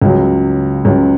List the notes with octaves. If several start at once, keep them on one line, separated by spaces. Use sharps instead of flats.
C#2 C#3 F#3
C#2 C#3 F#3